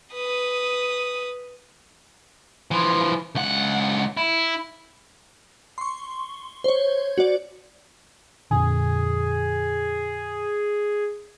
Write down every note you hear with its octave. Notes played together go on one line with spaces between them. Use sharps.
B4 D#6
E3 F3
C#2 F#5
E4
C6 C#6
C5 C#5
F#4 D5
F2 A#2 D3 G#4